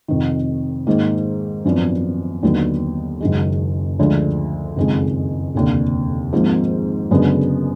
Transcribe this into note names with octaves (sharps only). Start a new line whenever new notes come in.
F1 F2 D#3
G#2 D#3 A#3 D#4
G#1 F#2 F3 B3 D4
D#2 D3 F#3 B3 D#4
F#1 F#2 D#3 G#3
D2 D3 F3 G#3
F#1 F2 D#3 G#3
F1 D#2 D3
G#1 G#2 F3 A#3
F#1 F#2 D3 G#3 B3